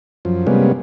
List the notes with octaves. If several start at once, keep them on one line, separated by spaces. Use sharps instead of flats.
F#2 F3
C3 G3 G#3 A#3 B3 C#4